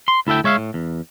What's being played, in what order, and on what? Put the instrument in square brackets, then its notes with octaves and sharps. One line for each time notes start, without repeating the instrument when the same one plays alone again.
[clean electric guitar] C6
D2 E4 A4 E5 G5
G#3 C#5 E5 F5
A2
E2